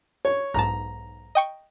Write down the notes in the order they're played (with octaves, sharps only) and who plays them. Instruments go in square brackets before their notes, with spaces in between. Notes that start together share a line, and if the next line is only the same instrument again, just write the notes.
[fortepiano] C#5
[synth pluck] B1 G#2 A5 [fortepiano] A#5
[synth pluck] D#5 G5 C#6